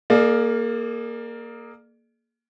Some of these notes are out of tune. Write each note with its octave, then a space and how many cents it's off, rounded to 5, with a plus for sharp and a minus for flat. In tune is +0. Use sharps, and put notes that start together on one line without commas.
A#3 +0 G#4 +40 D5 +30